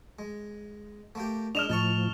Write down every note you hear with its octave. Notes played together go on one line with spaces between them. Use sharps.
G#3
A3 A#3 G4
A#2 G#3 D4 D#5 F6 E7 F7
A2 F3 D#4 A5 C#6